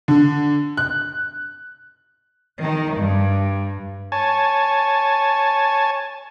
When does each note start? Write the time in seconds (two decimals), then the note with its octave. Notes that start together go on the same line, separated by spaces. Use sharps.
0.08 D3
0.77 F#6
2.60 D#3
2.98 G2
4.12 C#5 G#5 A5